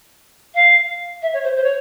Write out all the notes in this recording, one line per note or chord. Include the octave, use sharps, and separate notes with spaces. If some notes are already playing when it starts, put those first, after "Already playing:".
F5
E5
C#5
C5
C5
C#5